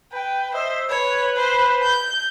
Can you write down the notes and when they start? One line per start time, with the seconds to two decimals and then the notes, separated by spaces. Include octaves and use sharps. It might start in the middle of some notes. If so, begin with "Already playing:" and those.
0.13 B4 G5
0.54 C5 D#5 E5
0.89 B4 C#5
1.37 C5
1.82 G6